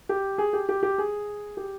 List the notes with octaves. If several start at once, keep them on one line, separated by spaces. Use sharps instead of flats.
G4
G#4
G4
G4
G4
G#4
G4